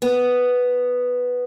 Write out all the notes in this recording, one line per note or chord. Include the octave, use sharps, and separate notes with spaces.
B3